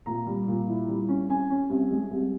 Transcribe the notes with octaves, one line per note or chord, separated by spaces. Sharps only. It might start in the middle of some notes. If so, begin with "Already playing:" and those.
A#2 A#5
G3
A#2
E4
G3
C#4
C#4 G#5
C#4
C2
G#3
C2